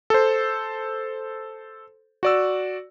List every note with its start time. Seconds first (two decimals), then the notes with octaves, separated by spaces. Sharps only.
0.10 A4 C5
2.23 F#4 D5 E6